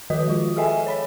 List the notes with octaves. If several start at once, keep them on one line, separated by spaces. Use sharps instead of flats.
D#3 F3 F#4 B4 D#5 D#6
G#3 F4
G#4 A4 D#5 E5 G5 G#5
C#5 B5 B6